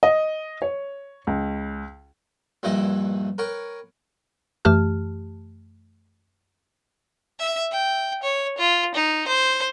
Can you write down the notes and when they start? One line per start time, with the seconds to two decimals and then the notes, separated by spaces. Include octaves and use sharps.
0.03 D#5
0.62 C#5
1.27 C#2
2.63 A#1 G2 E3 E4 D#5 E5
3.38 A#4 B4 C#5 G5 C#6
4.65 F#2 E3 A3 G4 A5 F6
7.39 E5
7.72 G5
8.23 C#5
8.59 F4
8.95 D#4
9.28 C5